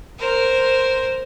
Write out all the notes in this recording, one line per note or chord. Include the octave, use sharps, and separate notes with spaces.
A#4 C5